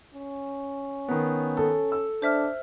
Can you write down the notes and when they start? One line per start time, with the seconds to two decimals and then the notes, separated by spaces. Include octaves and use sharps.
0.14 C#4
1.08 D#3 B3
1.57 A4
1.92 E6
2.22 D4 C5 E5 F6